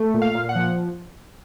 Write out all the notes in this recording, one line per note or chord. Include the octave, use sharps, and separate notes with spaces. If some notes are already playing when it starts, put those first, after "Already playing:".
Already playing: A3
A#2
F5
A#2
F#5
F3